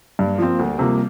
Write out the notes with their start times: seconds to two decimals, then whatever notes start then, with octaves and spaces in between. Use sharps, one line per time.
0.19 G2 A#3
0.38 F3 C4
0.58 D2 G3
0.79 C3 F3 A#3